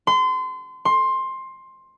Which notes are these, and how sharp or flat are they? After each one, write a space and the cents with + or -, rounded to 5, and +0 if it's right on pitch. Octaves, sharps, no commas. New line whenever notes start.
C6 -30
C6 +15